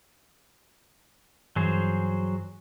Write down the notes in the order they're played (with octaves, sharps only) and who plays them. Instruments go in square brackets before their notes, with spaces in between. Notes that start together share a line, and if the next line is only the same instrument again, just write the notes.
[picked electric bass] G2 E3 [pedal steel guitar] F#3 G#4 C5